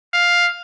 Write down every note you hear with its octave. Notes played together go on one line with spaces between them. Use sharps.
F5